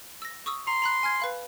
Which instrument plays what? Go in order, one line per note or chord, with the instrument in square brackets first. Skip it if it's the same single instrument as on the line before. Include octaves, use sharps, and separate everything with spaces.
[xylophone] E6 A#6
C#6 D#6 E6
[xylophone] A#5 [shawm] C6
[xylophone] A#5 B5 F#6
G#5 F6 G#6
B4 F5 B5